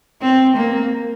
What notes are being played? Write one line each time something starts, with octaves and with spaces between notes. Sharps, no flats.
C4
A#3